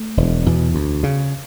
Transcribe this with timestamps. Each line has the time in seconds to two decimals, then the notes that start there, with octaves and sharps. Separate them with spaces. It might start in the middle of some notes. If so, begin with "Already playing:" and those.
Already playing: A3
0.17 E1
0.46 E2 B2
0.75 D2
1.03 C#3